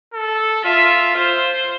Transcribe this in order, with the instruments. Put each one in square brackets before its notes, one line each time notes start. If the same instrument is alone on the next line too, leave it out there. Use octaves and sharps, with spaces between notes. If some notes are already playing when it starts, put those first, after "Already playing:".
[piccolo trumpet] A4
[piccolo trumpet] F4 [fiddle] E5
[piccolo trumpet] F4 [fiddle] C5